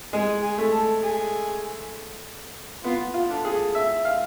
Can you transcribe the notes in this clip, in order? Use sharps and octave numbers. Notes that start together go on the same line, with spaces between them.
G#3 G#4
G#4
A3
A4
G#4
B3 F4
F4
D4 F4 A4
G#4
E5
F5